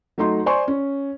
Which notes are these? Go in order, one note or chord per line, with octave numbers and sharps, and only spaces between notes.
F#3 A3 D#4 C6
C5 D5 G#5 C6 C#6
C#4